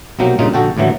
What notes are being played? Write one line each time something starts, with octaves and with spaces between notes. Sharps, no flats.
B1 C3 F#3 A#3 G5
G2 A#2 C#3 D#4 F4
A#1 D3 F#4 A4 G5
D#2 A2 D3 E3 F#3